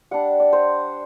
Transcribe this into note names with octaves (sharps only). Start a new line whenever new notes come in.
G3 D4 F#5
D5
C5